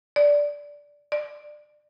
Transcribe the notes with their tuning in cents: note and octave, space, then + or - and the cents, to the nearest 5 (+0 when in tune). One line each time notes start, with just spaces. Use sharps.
D5 -10
D5 +25